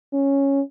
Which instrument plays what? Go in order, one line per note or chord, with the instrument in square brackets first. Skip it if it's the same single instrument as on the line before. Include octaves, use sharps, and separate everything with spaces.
[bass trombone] C#4